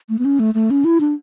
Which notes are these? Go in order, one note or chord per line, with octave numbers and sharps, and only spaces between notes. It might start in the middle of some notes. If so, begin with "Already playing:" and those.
A3
B3
C#4
A3
A3
C#4
E4
D4